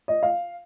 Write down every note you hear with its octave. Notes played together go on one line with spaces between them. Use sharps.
D#5
F5